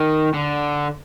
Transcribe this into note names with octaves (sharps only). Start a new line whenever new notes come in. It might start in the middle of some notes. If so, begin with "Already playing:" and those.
Already playing: D#3
D3